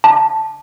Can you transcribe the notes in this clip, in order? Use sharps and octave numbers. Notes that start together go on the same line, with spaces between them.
A5